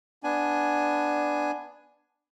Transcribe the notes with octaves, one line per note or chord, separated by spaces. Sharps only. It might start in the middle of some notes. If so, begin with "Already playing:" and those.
B3 D4 G#5